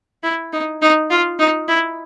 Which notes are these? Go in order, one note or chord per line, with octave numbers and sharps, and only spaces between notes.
E4
D#4
D#4
F4
D#4
E4